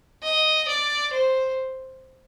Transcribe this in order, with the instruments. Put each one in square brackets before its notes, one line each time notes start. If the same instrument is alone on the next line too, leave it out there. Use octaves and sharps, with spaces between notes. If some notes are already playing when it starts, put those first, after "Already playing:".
[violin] D#5
D5
C5